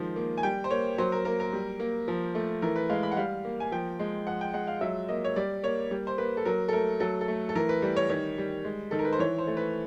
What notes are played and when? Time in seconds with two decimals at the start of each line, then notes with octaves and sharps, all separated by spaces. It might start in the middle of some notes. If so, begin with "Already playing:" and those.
Already playing: D#3 F3 G#3
0.16 A#3
0.38 G#5
0.43 G3 G5
0.64 C5
0.71 A#3 C#5
0.98 F#3 C5
1.12 A#4
1.25 A#3 A#4
1.40 A#4
1.53 G3
1.80 A#3
2.08 F3
2.35 A3
2.62 E3 A#4
2.76 B4
2.89 G#3 F5
3.03 B5
3.11 F#5
3.17 G3 F5
3.45 A#3
3.60 G#5
3.72 F3 G5
3.99 G#3
4.27 F3 F#5
4.41 G5
4.54 G#3 F#5
4.67 F5
4.81 F#3 E5
5.09 A#3 D#5
5.25 C#5
5.36 G3 D5
5.63 A#3 C#5
5.91 G3
6.07 C5
6.18 A#3 B4
6.37 A4
6.45 F#3 A#4
6.68 A4
6.73 A3 A#4
7.00 F#3 A4
7.21 A4
7.28 A3
7.49 A4
7.55 E3 A#4
7.69 B4
7.82 G3
7.97 C#5
8.10 D#3 C#5
8.38 G3
8.65 G#3
8.91 D#3 A4
8.99 A#4
9.05 B4
9.13 C5
9.19 E3 C#5
9.38 C5
9.47 A3
9.57 B4